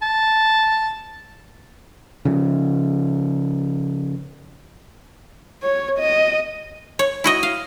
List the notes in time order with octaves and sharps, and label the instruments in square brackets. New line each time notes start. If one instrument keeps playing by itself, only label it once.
[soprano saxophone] A5
[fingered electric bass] C#3 F3
[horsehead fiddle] C#5
D#5
[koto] C#5
E4 F#4 D#5
F5